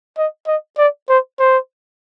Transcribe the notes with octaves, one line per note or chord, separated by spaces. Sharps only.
D#5
D#5
D5
C5
C5